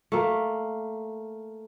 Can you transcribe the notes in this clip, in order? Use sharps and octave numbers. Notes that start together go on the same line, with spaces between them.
A3 A#3